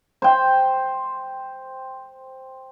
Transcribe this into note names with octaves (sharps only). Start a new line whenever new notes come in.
C5 G5